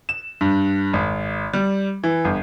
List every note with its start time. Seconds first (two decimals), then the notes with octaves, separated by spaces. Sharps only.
0.09 E7
0.41 G2
0.93 G#1
1.53 G3
2.04 E3
2.25 G1